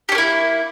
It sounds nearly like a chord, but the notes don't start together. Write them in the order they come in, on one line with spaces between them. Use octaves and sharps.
G4 C#4 A#3 E4